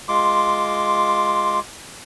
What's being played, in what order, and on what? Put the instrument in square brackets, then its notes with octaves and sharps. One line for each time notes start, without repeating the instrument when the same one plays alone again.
[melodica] G#3 F4 C6 D6